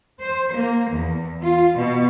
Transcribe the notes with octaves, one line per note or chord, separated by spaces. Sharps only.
C5
A#3
E2
F4
B2